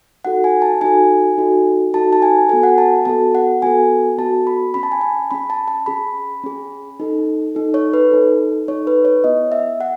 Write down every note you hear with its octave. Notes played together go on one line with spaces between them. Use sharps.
D#4 F#4 A4 F#5
G#5
A5
D#4 F#4 A4 G#5
D#4 F#4 A4
D#4 F#4 A4 A5
A5
G#5
B3 F#4 A4 G#5
F#5
A5
B3 F#4 A4 A5
F#5
B3 F#4 A4 G#5
B3 F#4 A4 A5
B5
C#4 G#4 B5
A5
G#5
A5
C#4 G#4 B5
A5
A5
C#4 G#4 B5
C#4 G#4
D#4 A4
D#4 A4
C#5
B4
D#4 A4
D#4 A4 C#5
B4
C#5
B3 E4 G#4 D#5
E5
G#4 F#5